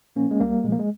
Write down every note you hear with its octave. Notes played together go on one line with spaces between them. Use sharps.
A#2 F3 A#3 C#4
G#3
C2 G3 A#3
A#2 F3 G#3 A#3
G#3